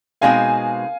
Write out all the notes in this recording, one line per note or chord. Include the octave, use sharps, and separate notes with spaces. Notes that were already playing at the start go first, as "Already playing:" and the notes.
B2 G#3 C4 D#4 G#4 F5 G#5